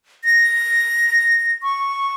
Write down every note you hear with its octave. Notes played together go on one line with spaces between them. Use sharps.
A#6
C#6